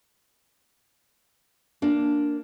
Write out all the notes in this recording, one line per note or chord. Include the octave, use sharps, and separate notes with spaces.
A#3 D4